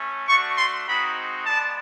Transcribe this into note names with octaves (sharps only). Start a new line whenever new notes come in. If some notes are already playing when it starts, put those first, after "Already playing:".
Already playing: A3 C#4
A3 D4 F#4 C#6
C6
G#3 C4 D#4 F#4 B5
G#3 B3 D4 A5